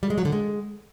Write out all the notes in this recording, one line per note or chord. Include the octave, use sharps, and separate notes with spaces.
G3
G#3
F#3
D3
G#3